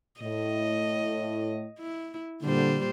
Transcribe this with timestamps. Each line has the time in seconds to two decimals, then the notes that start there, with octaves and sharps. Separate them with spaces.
0.20 A2 D#5
1.79 E4
2.42 A#2 D3 G3 C5